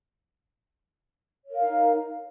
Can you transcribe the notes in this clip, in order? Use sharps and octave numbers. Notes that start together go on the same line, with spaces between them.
D#4 A#4 C#5 F5